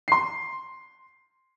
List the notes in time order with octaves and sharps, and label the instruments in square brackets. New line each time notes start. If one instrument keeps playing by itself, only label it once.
[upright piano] C6 C7